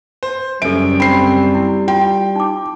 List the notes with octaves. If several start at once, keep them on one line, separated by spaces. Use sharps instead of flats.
C5
F#1 F#2 G3 A4 E5 D7
C4 B5 C7
E4
F4 G5 C6
D#4 D6